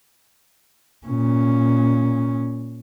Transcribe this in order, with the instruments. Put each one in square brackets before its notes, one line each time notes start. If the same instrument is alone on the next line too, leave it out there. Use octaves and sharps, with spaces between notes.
[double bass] A#2 C#4